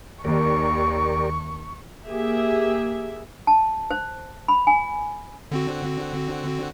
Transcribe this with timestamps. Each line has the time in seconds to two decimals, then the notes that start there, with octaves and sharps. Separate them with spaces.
0.25 D#2 G4 A#4 D5 C#6
2.09 A#3 G4 G#4 E5
3.47 A5
3.91 C5
4.48 B5
4.67 G#5
5.52 D3 C4 F#4